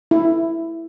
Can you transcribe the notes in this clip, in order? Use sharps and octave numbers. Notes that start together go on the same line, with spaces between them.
E4